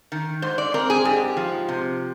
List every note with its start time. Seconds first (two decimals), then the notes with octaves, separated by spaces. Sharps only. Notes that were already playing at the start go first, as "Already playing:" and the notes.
0.12 D#3
0.42 G#2 C5
0.58 D5
0.74 C4 A#4
0.90 G#4
1.05 G#2 G4
1.37 F3
1.69 C3